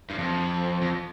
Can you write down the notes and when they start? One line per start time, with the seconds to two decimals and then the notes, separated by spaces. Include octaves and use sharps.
0.10 G2
0.18 F2
0.81 F2